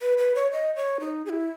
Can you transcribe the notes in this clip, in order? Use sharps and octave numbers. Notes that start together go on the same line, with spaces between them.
B4
B4
C#5
D#5
C#5
D#4
G#4
E4